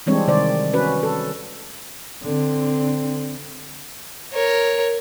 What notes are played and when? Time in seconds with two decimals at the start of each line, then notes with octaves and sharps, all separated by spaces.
0.06 E3 G3 G#3 C4 D4 C#5
0.27 C3 D#3 G#3 C5 D5
0.73 C#4 F#4 B4
1.03 A4
2.24 D3 C4
4.33 A#4 C#5